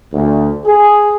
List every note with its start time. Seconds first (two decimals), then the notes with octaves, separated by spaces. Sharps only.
0.13 D2
0.65 G#4